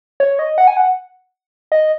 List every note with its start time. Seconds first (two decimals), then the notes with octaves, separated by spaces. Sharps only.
0.20 C#5
0.39 D#5
0.58 F#5
0.68 G#5
0.77 F#5
1.72 D#5